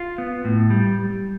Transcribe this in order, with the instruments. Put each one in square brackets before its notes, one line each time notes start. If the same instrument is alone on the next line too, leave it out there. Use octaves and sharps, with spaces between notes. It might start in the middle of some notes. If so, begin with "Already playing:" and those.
Already playing: [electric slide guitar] F4
B3
A2
G3